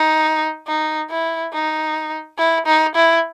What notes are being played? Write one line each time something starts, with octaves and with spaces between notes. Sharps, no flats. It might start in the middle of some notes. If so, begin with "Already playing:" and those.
Already playing: D#4
D#4
E4
D#4
E4
D#4
E4